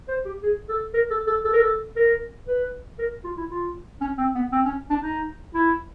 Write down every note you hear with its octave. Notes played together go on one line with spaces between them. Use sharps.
C5
G4
G#4
A4
A#4
A4
A4
A4
A#4
A4
A#4
B4
A#4
F4
E4
F4
C#4
C4
B3
C4
C#4
D4
D#4
E4